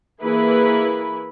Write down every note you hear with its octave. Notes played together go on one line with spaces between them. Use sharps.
E3 A#3 E4 G#4 B4 B5